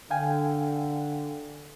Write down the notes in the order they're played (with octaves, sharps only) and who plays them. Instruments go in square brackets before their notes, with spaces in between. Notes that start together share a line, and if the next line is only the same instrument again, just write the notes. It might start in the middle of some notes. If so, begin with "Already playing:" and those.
[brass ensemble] D3 [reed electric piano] F5 G5 G#5